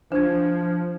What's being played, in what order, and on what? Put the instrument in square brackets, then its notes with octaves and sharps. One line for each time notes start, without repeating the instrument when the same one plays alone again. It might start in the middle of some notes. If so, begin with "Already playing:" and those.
[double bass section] F3 [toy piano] D4 [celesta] C5 G#6